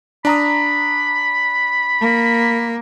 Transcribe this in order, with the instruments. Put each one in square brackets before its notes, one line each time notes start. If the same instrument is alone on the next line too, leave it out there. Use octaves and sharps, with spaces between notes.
[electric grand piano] D4 A#5 D#6 [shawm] B5
[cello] A#3